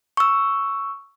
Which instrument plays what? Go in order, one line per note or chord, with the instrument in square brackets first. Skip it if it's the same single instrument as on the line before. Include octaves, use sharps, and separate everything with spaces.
[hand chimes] C#6 E6